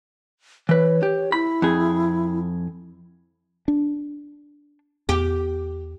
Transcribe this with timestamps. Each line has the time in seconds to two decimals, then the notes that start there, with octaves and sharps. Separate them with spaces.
0.69 E3 B4 C#5
1.03 G4
1.32 E4 B5
1.62 F2 G#4
3.68 D4
5.09 E2 G4